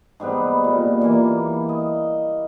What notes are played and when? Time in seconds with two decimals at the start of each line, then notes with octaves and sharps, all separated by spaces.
0.20 G#2 G3 B3 B4
0.64 A#2
1.01 E3 A#3
1.69 D#5